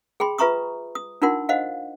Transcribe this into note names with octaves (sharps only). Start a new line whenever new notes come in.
G#4 G5 B5 C6
F4 B4 E5 A#5 C#6 D#6
D#6
D4 D#4 F4 A#4 F#5 C6
C5 D#5 F5 F#5